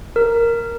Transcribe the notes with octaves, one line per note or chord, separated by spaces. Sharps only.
A#4